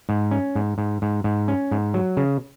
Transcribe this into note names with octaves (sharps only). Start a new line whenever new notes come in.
G#2
C#4
G#2
G#2
G#2
G#2
C#4
G#2
F#3
C#3